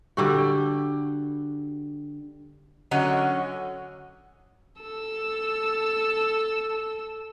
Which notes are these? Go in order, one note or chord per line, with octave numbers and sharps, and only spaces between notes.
D3 G3 F#4
D3 F#3 C#4 F#4 D#5
A4 E6